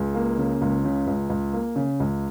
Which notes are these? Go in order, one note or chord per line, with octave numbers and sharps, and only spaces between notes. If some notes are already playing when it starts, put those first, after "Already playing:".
Already playing: C#2 G#4
A#3
C#3
C#2
C#3
C#2
C#2
A#3
C#3
C#2